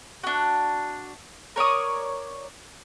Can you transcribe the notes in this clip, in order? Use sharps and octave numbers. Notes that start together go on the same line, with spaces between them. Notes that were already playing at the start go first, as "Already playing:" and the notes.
D4 F#4
A#4 C#5 D5 D#6